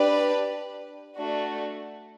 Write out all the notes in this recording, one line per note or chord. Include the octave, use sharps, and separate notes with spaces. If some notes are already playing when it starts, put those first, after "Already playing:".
Already playing: D4 G4 B4 D5
A3 D4 F#4